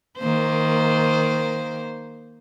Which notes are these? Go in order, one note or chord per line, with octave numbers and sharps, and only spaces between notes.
D#3 A#3 C5